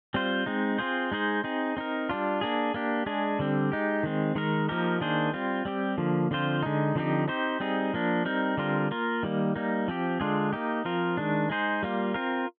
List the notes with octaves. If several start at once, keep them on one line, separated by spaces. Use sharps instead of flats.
G3 C4 F4 C5
G#3 C4 D#4
C4 F4 G#4 C5
G#3 D#4 G#4 C5
C4 D#4 G#4
C4 D#4 A#4
G3 D4 F4
A#3 D4 G#4
A#3 D4 G4
G#3 D4 G#4
D3 G3 C4
G#3 D#4 G4
D#3 G#3 C4
D#3 G#3 D#4 A#4
F3 A#3 D#4 G4 A#4
D#3 A#3 D4 G#4 C5
G3 C4 F4
G3 C4 G4
D3 F3 A#3
D3 F3 C4 F4 C5
D3 G#3 D#4
D3 F3 C4 D#4 G4
C4 D#4 G4 C5
G3 C4 D#4 G#4
F3 A#3 D4
G3 C4 D#4 A#4
D3 G3 C4 F4 A#4
A#3 F4 A#4
D#3 G3 A#3
G3 A#3 D#4
F3 C4 G4
D3 G#3 D4 F4 G#4
A#3 D#4 G4
F3 C4 F4 A#4
D#3 G#3 D4
G#3 D#4 G#4 C5
G3 A#3 F4
C4 F4 A#4